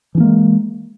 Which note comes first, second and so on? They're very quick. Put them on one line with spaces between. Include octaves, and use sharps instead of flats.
E3 D4 A#3 G#3